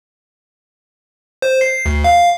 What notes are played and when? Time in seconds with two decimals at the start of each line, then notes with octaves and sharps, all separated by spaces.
1.42 C5
1.61 C7
1.86 D2
2.04 F5